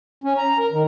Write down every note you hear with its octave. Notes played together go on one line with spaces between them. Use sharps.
C#4
A#5
A#4
D#3